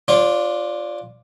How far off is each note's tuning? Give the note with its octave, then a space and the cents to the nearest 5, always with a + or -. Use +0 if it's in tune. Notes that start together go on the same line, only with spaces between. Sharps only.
D4 +0 F4 +0 C#5 -40